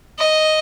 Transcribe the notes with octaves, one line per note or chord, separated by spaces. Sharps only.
D#5